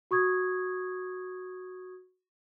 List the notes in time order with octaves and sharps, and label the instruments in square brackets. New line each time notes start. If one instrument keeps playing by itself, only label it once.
[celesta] F#4 C#6 D#6 G#6